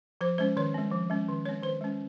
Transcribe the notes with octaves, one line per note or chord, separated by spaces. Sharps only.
F3 C5
G#3 C#4 C5
D#3 C#5
G#3 C4
F3
G#3 C#4
D#3
G#3 C4 C#5
D#3 C5
G#3 C#4